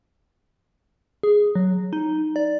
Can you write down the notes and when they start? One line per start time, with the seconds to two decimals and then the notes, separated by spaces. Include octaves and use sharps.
1.23 G#4
1.55 F#3
1.93 D#4
2.36 D5